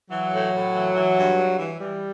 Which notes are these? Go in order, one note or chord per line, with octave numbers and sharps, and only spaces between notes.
E3 F#3
A2
A2
E3
E3
G2
G2
E3
E3 G3